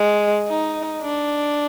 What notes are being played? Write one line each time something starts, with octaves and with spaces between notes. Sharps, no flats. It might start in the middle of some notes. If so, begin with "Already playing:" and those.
Already playing: G#3
D#4
D4